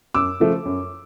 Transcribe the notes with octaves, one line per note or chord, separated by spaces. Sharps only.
F#2 D6 E6
C#3 F3 A3
F#2